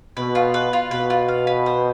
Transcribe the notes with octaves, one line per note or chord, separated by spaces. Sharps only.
B2 B4
F4
B4
F4
B2 B4
F4
F5
B4
C5